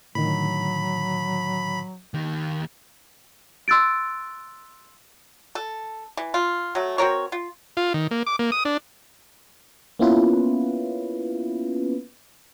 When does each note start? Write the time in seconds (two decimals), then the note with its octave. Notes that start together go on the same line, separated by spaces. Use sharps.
0.15 A2 D3 D#3 F#3 B5
2.14 D#2 D#3
3.68 C6 E6 F#6 A6 D7
5.55 A4
6.17 E3
6.34 F4
6.75 F#3 A3
6.98 C4 F#4 A#4 C#5
7.32 F4
7.77 F4
7.94 D#3
8.11 A#3
8.27 D6
8.39 A#3
8.52 D#6
8.65 D4
9.99 A#3 B3 C#4 E4 F4 B4